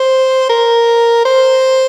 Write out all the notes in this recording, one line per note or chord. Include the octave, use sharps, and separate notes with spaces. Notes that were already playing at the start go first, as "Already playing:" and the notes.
Already playing: C5
A#4
C5